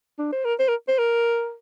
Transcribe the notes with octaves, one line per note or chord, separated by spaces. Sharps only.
D4
C5
A#4
C5
A#4
C5
A#4